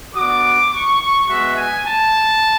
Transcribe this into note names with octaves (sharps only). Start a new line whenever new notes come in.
B3 D4 F#4 D6
C#6
C#6
G#3 B3 F#4 E5
G#5
A5